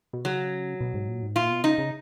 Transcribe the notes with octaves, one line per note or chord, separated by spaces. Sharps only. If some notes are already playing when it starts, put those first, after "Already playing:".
B2
C#3 F#3
B2
G#2
A#2
G#2
A#2 F4
B2
C#3 D#4
C#3